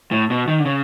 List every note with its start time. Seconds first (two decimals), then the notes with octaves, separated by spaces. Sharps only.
0.12 A2
0.30 B2
0.48 D#3
0.60 D3
0.65 C#3